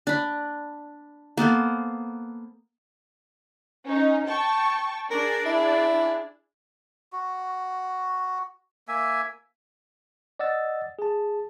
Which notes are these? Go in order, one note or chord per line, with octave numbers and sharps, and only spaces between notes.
D4 B5
A#3 B3 A4 C5
C#4 D#4
G5 A5 C#6
D4 G#4 A#4 D5
E4
F#4
A#3 E5 G#5
D5 D#5 F#5 E6 A6
G#4 A5